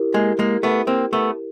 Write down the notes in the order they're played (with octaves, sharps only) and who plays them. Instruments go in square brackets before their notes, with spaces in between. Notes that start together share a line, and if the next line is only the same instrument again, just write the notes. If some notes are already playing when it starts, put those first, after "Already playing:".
Already playing: [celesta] E4 G4 A#4
[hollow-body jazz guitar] G#3 A#3
G#3 A#3
A3 B3
A#3 C4
A3 B3